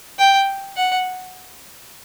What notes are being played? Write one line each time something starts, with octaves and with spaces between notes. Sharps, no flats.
G5
F#5